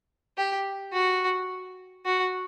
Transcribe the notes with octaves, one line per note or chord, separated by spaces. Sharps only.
G4
F#4
F#4